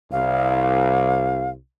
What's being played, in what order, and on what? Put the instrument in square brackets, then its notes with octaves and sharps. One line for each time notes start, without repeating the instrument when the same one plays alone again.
[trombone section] C2 [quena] F5